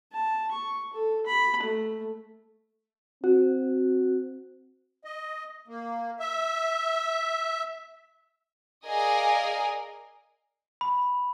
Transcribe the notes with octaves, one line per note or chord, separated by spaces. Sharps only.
A5
C#6
A4
B5
A3
C4 F#4
D#5
A#3
E5
G#4 A#4 D5 D#5 F5 G#5
B5